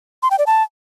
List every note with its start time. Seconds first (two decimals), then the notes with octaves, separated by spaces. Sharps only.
0.23 C6
0.31 G5
0.39 D5
0.47 A5